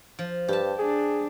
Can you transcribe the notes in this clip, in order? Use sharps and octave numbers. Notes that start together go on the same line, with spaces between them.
F3
G2 G4 A5
D4 G#4